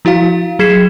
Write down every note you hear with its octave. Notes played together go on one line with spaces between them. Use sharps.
F3 E4 F#4 F5
F#3 G#4 G#6 B6 C7 E7